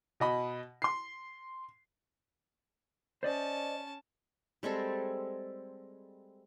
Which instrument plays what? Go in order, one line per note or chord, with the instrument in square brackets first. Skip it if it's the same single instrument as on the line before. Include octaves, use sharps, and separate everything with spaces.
[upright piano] B2 D#5 B5
C6 C7
[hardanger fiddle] C#4 A5 [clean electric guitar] C5 D5 D#5
[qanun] G3 G#3 C4 A4